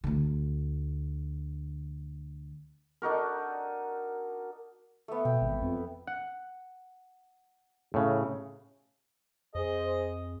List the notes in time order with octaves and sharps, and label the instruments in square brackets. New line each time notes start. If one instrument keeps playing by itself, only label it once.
[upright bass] D2 D3
[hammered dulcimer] D4 D#4 F#4 A#4
[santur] A3 B3
[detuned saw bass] B2 [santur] G5
[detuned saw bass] G#1
F2
[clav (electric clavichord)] F#5
A2 C#3
[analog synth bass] F2 [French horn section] G#4 C5 [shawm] D#5